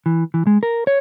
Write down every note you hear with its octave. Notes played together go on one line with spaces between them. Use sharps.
E3
E3
G#3
A#4
C#5